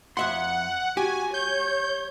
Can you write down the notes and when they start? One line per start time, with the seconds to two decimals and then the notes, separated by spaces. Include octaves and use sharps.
0.17 F2 E5 F#5 C6
0.97 F#4 G4 G#5
1.34 C#5 G6